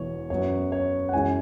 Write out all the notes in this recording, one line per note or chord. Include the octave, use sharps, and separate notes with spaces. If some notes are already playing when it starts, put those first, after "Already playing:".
Already playing: E1 E2 E3 C#5
F#2 F#3 B3 C#5
C#5
F#5
F#2 E3 G#3 C#4 G#5